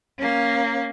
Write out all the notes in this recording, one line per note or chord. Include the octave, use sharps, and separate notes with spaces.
A#3 C#4